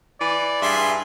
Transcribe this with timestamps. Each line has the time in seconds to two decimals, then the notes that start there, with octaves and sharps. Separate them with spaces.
0.21 E3 D5
0.62 G2 G#4 E5 C6